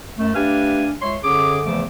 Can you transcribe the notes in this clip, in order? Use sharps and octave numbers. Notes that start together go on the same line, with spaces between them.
F#2 A3
A3 D4 G4 B4 F5 G#5
C#2 C#5 E5 C6
F#2 D3 C#4 G#4 D6
E2 C#3 E3 F3 A3 D6